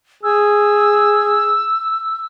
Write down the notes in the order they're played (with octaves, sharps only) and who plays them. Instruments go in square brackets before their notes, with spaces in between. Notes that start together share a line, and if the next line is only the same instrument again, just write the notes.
[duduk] G#4 [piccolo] E6